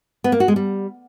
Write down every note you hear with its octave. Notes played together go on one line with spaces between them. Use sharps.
B3
A#3
F#4
G#3
G3